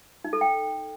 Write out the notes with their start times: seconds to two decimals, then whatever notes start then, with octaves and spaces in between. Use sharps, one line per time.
0.24 D#4
0.33 A4
0.41 G5